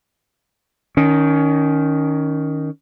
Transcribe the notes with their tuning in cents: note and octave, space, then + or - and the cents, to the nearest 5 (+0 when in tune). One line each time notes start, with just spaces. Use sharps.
D#3 +0 C#4 +20